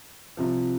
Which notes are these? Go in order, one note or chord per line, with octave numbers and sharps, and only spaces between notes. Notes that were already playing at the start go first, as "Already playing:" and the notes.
C2 C3 F3